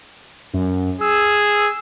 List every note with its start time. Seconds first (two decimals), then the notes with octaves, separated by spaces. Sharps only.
0.54 F#2
1.01 G#4 E6